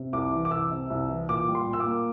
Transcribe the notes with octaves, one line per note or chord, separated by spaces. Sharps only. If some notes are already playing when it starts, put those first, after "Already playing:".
Already playing: C3
C2 D6
E3
D6
C2 E6
C3
C2
E3
A#2 D6
G3
C6
A#2
E6
D6
A#3